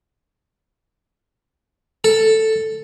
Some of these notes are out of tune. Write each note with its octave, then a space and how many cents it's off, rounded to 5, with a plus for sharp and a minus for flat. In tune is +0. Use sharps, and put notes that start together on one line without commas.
A4 +5